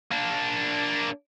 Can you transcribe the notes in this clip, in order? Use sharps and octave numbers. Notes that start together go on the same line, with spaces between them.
A#3 D4